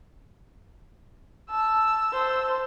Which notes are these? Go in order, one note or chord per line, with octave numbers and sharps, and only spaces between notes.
A5 E6
C5 A5